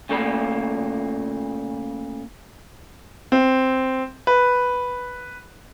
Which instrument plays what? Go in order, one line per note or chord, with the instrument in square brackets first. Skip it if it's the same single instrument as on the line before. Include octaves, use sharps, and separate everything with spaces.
[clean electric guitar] A#2 C#3 A3 A#3 D5 B5
[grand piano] C4
B4